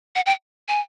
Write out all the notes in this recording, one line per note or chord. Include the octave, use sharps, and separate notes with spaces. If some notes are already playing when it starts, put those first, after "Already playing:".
F#5
G5
G#5